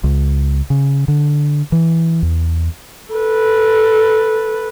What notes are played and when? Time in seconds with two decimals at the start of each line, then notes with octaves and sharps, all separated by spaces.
0.04 C#2
0.70 C#3
1.08 D3
1.72 E3
2.22 E2
3.11 A4 B4